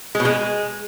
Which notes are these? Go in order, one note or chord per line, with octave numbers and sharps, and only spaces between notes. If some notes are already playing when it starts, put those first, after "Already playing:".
G#3
B2
G#3